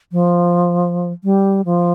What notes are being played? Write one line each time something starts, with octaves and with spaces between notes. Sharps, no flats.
F3
G3
F3